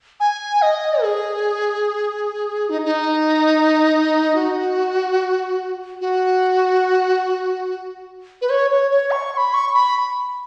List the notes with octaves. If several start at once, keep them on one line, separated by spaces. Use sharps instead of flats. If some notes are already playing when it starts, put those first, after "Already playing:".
G#5
D#5
G#4
D#4
D#4
F#4
F#4
B4
C#5
C#5
C#5
C#6
C#6
B5
C#6
B5